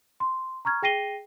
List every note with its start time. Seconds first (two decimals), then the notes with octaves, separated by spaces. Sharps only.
0.20 C6
0.65 A#5 C#6 F6 G#6
0.82 G#4 G5 A#6 C7 D#7 G7